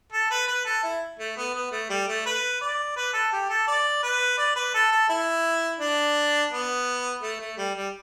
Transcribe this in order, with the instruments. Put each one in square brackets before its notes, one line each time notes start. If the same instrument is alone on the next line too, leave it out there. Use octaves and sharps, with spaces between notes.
[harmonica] A4
B4
B4
A4
E4
A3
B3
B3
A3
G3
A3
B4
D5
B4
A4
G4
A4
D5
B4
D5
B4
A4
A4
E4
D4
B3
A3
A3
G3
G3